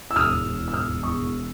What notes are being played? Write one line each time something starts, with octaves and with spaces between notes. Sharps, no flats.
E6
E1 D#6 F6
E1
E1
E1
E6
E1 D#6 F6
E1
E2 C#6 D#6
E1